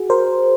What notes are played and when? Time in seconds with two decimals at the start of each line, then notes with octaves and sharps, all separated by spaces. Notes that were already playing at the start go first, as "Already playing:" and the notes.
Already playing: F#4 G#4
0.10 A#4 C5